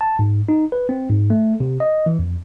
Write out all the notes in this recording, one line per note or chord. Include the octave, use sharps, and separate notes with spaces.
A5
G#2
D#4
B4
C4
G#2
A3
C3
D#5
E3
F2